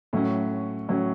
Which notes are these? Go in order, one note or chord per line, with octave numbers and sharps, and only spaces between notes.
A2 F#3 C#4
A2 F#3 C#4